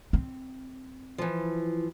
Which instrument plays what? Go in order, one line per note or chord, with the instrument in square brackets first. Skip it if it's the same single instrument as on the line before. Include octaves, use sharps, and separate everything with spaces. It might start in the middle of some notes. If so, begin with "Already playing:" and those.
[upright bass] C4
[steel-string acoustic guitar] E3 F3